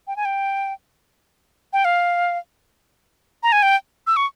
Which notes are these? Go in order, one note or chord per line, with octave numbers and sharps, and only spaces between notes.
G5
G#5
G5
G5
F5
A#5
G#5
G5
E6
C#6